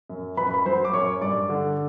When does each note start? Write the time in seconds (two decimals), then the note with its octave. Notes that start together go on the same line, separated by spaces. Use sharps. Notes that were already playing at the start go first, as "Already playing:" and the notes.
0.09 F#2
0.37 F#2 B4 B5
0.54 B5
0.65 F#3 C5 C6
0.85 D6
0.93 F#2 C#5 C#6
1.21 G2 D5 D6
1.49 D3